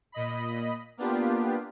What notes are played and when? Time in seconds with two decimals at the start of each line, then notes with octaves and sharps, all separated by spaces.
0.12 A#2 D#5 B5
0.97 A#3 B3 D4 F4 G4